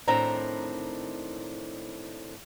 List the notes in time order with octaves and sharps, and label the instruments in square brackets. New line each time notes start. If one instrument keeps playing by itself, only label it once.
[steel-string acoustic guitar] A2 D#3 C4 D4 A#5